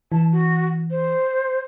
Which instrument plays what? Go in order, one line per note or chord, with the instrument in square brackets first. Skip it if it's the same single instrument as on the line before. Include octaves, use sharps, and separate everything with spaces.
[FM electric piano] E3 [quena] A5
[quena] F#4
C5